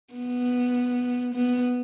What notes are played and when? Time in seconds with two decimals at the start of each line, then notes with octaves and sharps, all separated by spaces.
0.14 B3
1.35 B3